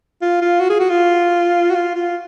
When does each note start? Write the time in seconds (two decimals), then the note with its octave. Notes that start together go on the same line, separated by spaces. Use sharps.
0.22 F4
0.42 F4
0.60 F#4
0.70 G#4
0.80 F#4
0.90 F4
1.70 F#4
1.75 F4
1.95 F4